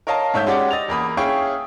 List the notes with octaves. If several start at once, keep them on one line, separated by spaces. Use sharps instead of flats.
A#4 C#5 D#5 F5 A5
G#2 A3 C#5 E5 E6 G6
G#3 C#4 F#4 G4 D5 F#5
D#5 A6 F7
E2 A#3 B5 D#6
C#4 E4 G#4 F5 G5 C#6